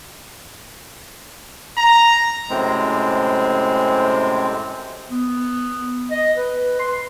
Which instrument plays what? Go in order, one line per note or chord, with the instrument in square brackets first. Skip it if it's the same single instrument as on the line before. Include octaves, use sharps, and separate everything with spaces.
[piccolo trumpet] A#5
[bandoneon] F#2 A2 C3 G#3 C4
[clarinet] B3
D#5
B4
C6